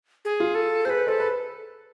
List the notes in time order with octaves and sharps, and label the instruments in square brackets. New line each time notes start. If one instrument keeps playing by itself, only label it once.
[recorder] G#4
[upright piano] F4
[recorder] A4
[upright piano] G#4 [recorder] B4 C5
[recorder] A4 [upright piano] C5
[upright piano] B4